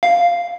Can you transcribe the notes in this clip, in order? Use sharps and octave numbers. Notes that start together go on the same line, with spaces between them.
F5